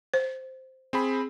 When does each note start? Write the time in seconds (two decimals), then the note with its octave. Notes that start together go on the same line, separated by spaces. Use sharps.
0.14 C5
0.93 C4 G#4 B5